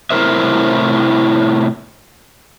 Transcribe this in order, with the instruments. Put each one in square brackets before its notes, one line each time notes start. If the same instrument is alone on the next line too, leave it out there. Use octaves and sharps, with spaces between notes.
[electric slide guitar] A2 C3 E4 A#4 C5 E5